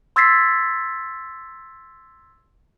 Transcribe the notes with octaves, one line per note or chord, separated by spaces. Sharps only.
C6 E6 G#6 A6 B6 C7